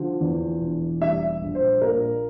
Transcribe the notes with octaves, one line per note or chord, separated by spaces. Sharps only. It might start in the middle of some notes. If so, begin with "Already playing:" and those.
Already playing: D3 F3
E2
E1
G3 E5
A#1
C5
A#2 A#4